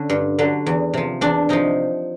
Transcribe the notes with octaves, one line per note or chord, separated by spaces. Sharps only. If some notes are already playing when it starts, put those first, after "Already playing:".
Already playing: D3 C#4
G2
D3 F#3
E2
C3 F3
E2 D4
C3 F3 D#4